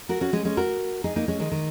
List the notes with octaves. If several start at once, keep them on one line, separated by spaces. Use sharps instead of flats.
F#4 A#4
C#4 F#4
G#3 C#4
G#3 C#4
F#4 A#4
D#4 G#4
A#3 D#4
G#3 C#4
D#3 G#3
D#3